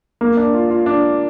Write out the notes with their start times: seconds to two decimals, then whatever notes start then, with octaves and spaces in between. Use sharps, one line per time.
0.21 A#3
0.37 D4
0.54 F4
0.70 F4
0.86 D4